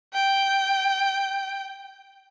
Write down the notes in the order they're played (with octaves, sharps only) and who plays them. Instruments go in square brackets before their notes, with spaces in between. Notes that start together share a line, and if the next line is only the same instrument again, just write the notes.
[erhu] G5